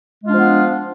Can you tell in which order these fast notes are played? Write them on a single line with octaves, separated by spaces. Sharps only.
G#3 F4 D4 F3 B3